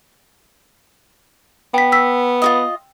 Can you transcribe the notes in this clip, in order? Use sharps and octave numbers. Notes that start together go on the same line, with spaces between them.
B3 G5 B6
E6 B6
F4 F#4 D#5